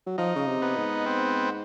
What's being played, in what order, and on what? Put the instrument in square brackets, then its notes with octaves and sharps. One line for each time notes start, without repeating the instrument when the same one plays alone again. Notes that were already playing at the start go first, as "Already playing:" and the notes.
[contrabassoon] F#3
[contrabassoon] F3 [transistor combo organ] D#4
[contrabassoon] C#3
C3
[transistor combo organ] B3
[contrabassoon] G#2
[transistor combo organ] C4